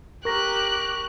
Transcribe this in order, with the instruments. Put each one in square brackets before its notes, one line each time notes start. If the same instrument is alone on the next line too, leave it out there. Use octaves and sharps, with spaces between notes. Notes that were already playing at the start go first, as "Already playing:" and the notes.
[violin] G4 F#6 [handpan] A#4 [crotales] C#6 A#6